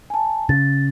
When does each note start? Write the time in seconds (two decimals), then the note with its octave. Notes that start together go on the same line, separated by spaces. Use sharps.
0.10 G#5 A5
0.49 C#3 A6